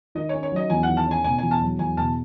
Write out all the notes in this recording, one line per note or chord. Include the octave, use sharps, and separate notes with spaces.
D#3 D#5
C#4 C#5
C#5
F#3 D#5
E2 G#5
F#5
D#3
A5
C#4 G#5
B2 G#5
E2 G#5
A5
F#3
E2 G#5
B2 A5